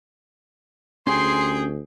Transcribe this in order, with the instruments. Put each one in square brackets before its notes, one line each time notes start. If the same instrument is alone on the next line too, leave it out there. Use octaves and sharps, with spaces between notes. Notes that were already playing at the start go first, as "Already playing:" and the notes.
[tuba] D2 [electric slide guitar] C#4 G4 G#5 [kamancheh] G#4 G5 [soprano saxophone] C6